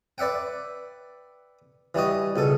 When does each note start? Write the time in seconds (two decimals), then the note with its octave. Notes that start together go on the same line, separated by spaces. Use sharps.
0.18 B4 D5 E5 F#5 G5
1.95 E3 G3 F#4 D#5
2.36 C#2 B2 A4